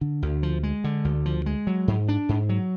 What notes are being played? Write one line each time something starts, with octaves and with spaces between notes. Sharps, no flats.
D3
D2
F3
G#3
D3
D2
F3
G#3
F#3
G#2
D4
G#2
F#3